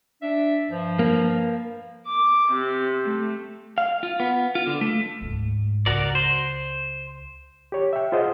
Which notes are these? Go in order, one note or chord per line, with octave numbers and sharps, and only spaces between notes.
D4 E5
G2 F3
A#3
D6
C3
A3
F5
F4
B3
F4
D3
A3
D2 G#2
C#2 F#4 A#4 D5
C5
G4 C#5
E5 G5
F4 G#4 C5 D#5 F#5